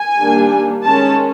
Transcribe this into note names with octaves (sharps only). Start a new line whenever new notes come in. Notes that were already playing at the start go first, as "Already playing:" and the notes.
Already playing: G#5
D#3 G3 A#3 D4
D#3 G#3 C#4 A5